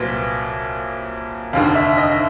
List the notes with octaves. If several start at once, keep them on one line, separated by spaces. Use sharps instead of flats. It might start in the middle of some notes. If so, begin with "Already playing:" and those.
Already playing: C2 A#2 F#3 B4
F1 D#2 D3 F5
E5
D#5